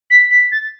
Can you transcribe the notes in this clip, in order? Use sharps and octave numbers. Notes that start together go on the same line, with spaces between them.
B6
B6
A6